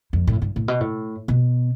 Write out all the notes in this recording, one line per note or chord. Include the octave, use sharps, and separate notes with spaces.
F2
A2
G2
A2
B2
A2
B2